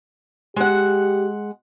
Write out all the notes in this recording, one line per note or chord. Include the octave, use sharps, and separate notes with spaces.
G#3 G4 F#5